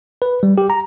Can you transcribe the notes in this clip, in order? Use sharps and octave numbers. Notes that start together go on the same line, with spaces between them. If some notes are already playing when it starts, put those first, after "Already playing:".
B4
G3
G4
A#5